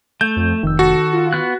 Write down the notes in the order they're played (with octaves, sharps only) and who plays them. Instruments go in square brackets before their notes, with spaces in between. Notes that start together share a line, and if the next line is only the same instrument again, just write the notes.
[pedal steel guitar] A3 [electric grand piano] G6
[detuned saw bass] F2
[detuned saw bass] F1 [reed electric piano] D#3 E6
[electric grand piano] F#4 [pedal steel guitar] A4
[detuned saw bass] F4
[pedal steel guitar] B3 F#6